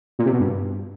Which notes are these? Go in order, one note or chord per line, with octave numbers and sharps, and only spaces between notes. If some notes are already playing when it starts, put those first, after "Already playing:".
A#2
C3
B2
G2